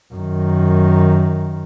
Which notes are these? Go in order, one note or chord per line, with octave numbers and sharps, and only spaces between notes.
F#2 D#3